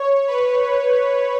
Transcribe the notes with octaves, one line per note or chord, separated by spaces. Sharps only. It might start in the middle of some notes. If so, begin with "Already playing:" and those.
Already playing: C#5
B4